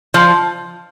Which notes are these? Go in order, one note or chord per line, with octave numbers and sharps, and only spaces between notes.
F3